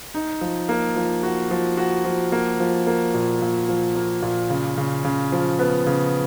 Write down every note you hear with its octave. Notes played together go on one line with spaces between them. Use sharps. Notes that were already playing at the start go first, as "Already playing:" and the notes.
D#4
F3
A#3
F3
F#4
F3
F#4
F3
A#3
F3
A#3
A#2
A#2
F3
A#3
A#2
C#3
C#3
C#3
F3
B3
C#3